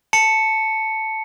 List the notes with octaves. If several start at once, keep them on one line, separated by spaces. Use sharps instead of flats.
A5 C#7